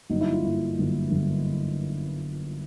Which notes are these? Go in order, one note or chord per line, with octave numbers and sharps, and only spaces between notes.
G1 G2 D3 F#3 A#3 D#4
E4
F4
G1 G2 D3 F#3 A#3 E4
G1 G2 D3 F#3 A#3
G1 G2 D3 F#3 A#3